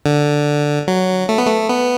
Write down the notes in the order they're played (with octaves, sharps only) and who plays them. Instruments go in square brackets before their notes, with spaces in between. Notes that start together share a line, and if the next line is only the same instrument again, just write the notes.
[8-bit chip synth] D3
F#3
A3
B3
A3
B3